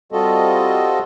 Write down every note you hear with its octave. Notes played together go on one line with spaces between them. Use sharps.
G3 C4 F4 F#4 A4 D#5